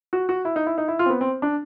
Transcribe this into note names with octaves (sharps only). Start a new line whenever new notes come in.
F#4
F#4
E4
D#4
E4
D#4
E4
F4
C4
B3
C4
D4